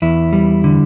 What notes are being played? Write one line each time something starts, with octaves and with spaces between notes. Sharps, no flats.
E2 E4
G3
D3